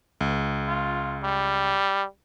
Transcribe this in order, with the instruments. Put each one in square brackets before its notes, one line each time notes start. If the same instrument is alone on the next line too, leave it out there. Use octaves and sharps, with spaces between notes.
[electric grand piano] C#2
[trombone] F4
G3